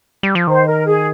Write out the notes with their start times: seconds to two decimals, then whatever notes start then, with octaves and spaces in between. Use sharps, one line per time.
0.23 G3
0.35 F3
0.47 D#3 C5
0.66 A#4
0.86 G#4